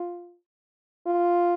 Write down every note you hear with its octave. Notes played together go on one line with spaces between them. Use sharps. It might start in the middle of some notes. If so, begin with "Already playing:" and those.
Already playing: F4
F4